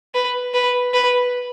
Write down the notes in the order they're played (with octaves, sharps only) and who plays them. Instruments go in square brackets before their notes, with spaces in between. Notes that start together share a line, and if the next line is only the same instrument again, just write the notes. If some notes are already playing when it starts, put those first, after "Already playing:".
[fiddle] B4
B4
B4